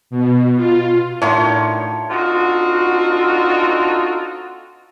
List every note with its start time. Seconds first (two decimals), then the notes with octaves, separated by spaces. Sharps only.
0.10 B2
0.56 F4
1.22 A2 D3 D#3 F4 C#5 A5
2.10 C4 D4 D#4 F4 F#4 A4